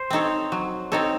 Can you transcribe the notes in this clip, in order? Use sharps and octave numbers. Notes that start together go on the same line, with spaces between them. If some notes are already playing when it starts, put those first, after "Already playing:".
Already playing: C5
C4 D#4 A4 C#5
F#3
C4 D#4 A4 C#5